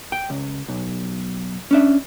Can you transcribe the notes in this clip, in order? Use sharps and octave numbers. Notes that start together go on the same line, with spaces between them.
G5
C#2
B1
C#4 D4 E5